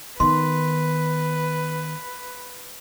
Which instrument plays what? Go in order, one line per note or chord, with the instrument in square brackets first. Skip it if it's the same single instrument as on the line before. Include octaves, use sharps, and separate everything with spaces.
[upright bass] D#3 B3 [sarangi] B4 [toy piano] C6